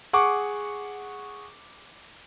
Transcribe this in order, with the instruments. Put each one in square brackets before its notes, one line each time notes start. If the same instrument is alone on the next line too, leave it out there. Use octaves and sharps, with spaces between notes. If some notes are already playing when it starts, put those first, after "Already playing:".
[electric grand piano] G#4 F#5 C#6 D6